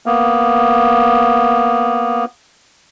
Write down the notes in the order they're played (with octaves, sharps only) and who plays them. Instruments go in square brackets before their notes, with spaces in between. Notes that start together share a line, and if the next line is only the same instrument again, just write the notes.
[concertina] A#3 B3